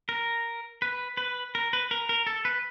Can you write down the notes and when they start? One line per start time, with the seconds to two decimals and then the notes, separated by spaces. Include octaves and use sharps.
0.09 A#4
0.82 B4
1.17 B4
1.55 A#4
1.73 B4
1.91 A#4
2.09 A#4
2.27 A4
2.45 B4